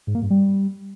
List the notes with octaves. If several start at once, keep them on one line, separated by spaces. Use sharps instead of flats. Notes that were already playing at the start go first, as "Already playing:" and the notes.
G#2
A#3
G2
G3